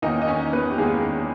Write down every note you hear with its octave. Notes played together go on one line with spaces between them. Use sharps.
E2 D#3 A#3 C#4 D#4 D#5
D#5
C#4 C#5
B3 B4
G4
E2 D#3 G#3 A#3 C#4 G#4